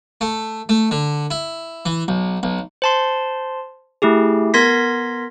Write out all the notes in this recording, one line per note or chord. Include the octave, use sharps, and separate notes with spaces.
A3
A3
D3
E4
E3
B1
B1
C5 A5 C6
A3 E4 G4 G#4
B3 A#4 C6 G#6 A#6 B6